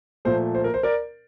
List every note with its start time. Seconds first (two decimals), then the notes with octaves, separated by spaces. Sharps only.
0.25 A#2 F3 A3 C5
0.55 C5
0.64 A#4
0.74 C5
0.83 A#4 D5